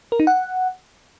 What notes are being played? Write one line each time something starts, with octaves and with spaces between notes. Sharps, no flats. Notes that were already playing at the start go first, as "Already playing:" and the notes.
A#4
D#4
F#5